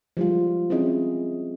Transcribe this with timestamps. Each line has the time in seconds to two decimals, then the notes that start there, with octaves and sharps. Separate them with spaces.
0.17 F3 G3 G#3 F4
0.70 C4 C#4 E4 G#4 D#5